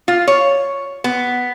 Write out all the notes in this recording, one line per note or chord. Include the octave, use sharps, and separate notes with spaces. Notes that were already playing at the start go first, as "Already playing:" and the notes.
F4
C#5
B3